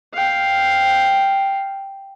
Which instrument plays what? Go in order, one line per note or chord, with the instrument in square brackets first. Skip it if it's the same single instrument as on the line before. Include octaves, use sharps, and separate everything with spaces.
[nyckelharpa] F5 G5